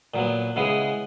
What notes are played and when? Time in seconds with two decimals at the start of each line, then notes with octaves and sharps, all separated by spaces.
0.14 A#2 F#3 B3
0.56 C#3 G#3 B3 E4 G#4